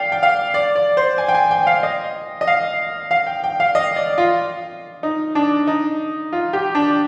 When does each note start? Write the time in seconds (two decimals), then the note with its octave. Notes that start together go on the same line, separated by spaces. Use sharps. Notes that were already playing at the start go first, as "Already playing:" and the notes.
Already playing: D5 F5 G5
0.12 G5
0.23 F5
0.54 D5
0.76 D5
0.97 C5
1.18 G#5
1.28 G5
1.34 G#5
1.51 G5
1.67 F5
1.83 D#5
2.41 D#5
2.47 F5
3.11 F5
3.27 G5
3.44 G5
3.60 F5
3.75 D#5
3.96 D5
4.18 F4
5.03 D#4
5.35 D4
5.67 D#4
6.32 F4
6.53 G4
6.75 D4